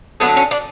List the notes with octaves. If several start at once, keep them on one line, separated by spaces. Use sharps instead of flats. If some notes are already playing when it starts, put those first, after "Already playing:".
D3 F#3 A3 B3
C#4
D4